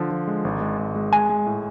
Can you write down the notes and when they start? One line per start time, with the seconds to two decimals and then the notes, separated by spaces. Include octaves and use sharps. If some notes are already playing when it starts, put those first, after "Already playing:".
Already playing: D3 F3
0.11 F3
0.28 G#3
0.45 G#1
0.61 G#3
0.79 G#1
0.96 G#3
1.13 G#3 G#5
1.30 G#3
1.46 A2